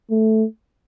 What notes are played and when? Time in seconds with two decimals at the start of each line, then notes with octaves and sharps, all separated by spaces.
0.11 A3